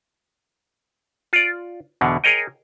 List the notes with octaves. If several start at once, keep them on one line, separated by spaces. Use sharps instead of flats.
F4 D5
E2 B2 D3
G#4 A#4 C#5 D#5 G5